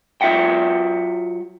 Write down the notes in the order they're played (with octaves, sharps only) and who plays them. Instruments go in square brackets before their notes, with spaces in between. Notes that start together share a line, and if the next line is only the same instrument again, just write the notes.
[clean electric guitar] F#3 F4 E5 F#5 G5